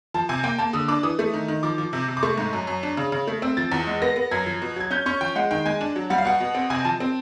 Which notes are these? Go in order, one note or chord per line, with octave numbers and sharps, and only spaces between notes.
F3 A5
C3 G#5
A#3 G5
A#3 A5
D3 D#6
D4 D6
E3 D#6
A3
D#3
D#3
F3 D6
F3
C3
C3
D6
A3 C#6
G#2
F#2
F#2
D4
C#3
C#3
A3
C4 E6
F3 A6
E2
G#3
B3 A#6
B3
F#2 G#6
F3
B2
F#3 G#6
C#4 G6
C#4 C#6
F3 G5
G#3 F#5
D#3 G5
G#3 G#5
D4
F#3
G3 F#5
F5
B2 F#5
B2
C4
C3 G#5
F3 A5
C4